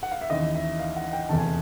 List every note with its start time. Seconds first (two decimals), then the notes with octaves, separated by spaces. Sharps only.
0.03 F#5
0.12 F5
0.21 E5
0.30 D#2 C#3 E3 D#5
0.55 E5
0.80 F5
0.96 F#5
1.13 G5
1.29 F1 E2 C#3 A5
1.38 G#5